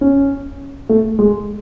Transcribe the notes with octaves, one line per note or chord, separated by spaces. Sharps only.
C#4
A3
G#3